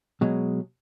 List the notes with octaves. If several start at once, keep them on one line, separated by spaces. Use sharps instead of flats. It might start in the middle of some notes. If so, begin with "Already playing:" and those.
B2 F#3 G#3